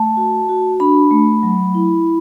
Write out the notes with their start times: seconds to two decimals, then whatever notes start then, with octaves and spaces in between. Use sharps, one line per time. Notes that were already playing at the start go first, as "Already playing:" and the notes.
Already playing: A3 A5
0.17 F#4
0.49 F#4
0.80 D4 B5
1.11 A3
1.43 F#3
1.74 E4